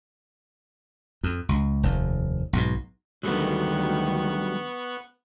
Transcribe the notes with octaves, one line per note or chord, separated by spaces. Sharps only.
F2
C#2
F1 D#2
B1 G#2 B2
D2 D#3 F#3 G3 A3 B3 C#6 F#6